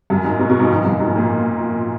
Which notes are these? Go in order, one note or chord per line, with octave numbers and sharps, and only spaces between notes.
F#2
G#2
B2
B2
G#2
F2
F#2
G#2
A#2